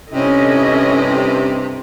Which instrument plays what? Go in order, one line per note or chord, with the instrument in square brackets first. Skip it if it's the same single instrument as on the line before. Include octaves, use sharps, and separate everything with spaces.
[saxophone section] G2 C3 [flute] C#4 [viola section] E4 A4 D#5